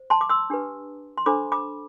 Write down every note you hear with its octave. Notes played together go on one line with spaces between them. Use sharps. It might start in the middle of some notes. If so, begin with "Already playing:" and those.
Already playing: C5
A5 C6
D6
C6 E6
D4 G4 B4
C6
D4 A4 C5 B5 D6
B5 D6